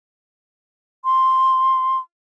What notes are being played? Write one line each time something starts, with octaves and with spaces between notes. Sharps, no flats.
C6